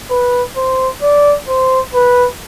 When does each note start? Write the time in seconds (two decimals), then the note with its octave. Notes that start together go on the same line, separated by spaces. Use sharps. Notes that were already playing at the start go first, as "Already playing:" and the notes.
0.10 B4
0.56 C5
1.02 D5
1.48 C5
1.94 B4